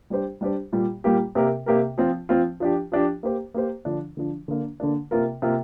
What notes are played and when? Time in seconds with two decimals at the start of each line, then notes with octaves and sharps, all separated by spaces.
0.10 G3 D4 G4 C5
0.41 G3 D4 G4 C5
0.72 A#2 G3 A#3 G4
1.04 A#2 G3 A#3 G4
1.35 C3 A#3 G4 A#4
1.66 C3 A#3 G4 A#4
1.98 F3 C4 F4
2.29 F3 C4 F4
2.60 F3 D4 G4
2.92 F3 D4 G4
3.23 A#3 G4 C5
3.54 A#3 G4 C5
3.85 D3 F3 D4
4.17 D3 F3 D4
4.48 D3 A#3 D4
4.80 D3 A#3 D4
5.11 C3 A#3 F4 A#4
5.42 C3 A#3 F4 A#4